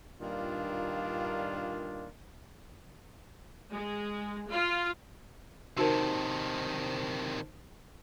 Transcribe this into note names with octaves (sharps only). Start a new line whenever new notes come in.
G2 A#2 D#3 A#3 D4 F4
G#3
F4
C3 D#3 D#4 F#4 A#4 C5 A5